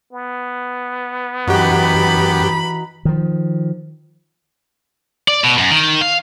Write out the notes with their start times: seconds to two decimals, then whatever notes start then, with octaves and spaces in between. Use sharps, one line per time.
0.13 B3
1.47 F#2 E3 D#4 F#4 G4 B5
3.05 D#3 F3
5.28 D5
5.44 B2
5.58 F#2
5.71 D#3
6.01 F5